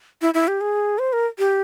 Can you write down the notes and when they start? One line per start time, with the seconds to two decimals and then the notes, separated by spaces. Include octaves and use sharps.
0.22 E4
0.34 E4
0.48 G4
0.61 G#4
0.99 C5
1.13 A#4
1.39 G4